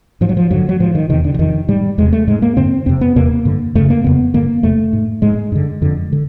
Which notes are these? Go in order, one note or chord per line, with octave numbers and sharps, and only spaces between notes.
G#2 F3
F#3
F3
G2 D3 F#3
F#3
G#2 F3
D#3
E2 C3 D#3
D3
D3
F2 C3 D#3
G#2 G3
E2 C3 G#3
A3
G#2 G#3
A#3
G2 D3 C4
F2 C3 C4
B3
E2 C3 A#3
G2 D3
F#2 C#3 A3
A#3
F2 C#3 B3
G2 D3 A#3
F2 C3 A3
G#2
G#2 G#3
G2 D3
F2 D3
D3